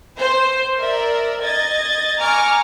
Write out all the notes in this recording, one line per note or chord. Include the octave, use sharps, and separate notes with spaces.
C5
A#4 D5 E5
D#5 G#6 A6
G#5 A#5 C#6 D6 F6